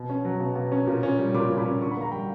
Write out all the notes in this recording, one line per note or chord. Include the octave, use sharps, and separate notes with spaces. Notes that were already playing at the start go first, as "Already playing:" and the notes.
Already playing: B2
C#4
F#3
B2
B2
C#4
A#2
C#4
G3
A#2 B5 D6
A#2
B5 D6
C#4
D3 C#6
B5
A#3 A#5
G3 G5 B5